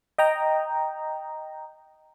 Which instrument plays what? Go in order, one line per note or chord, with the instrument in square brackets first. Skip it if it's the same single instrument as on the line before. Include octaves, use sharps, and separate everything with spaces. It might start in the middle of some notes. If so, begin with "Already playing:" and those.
[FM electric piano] D#5 G5 A#5